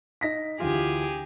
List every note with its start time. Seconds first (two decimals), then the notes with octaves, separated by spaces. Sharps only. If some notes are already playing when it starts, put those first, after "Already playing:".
0.21 D#4 A#6 B6
0.60 D2 E3 F4 G4 G#4